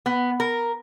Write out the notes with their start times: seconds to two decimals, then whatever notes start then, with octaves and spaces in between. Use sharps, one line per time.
0.06 B3
0.40 A#4